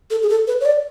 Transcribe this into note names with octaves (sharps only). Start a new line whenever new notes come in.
A4
G#4
A4
B4
C#5
D5